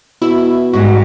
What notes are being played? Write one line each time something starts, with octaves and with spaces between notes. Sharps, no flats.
B2 E4
G#2 G3 F#4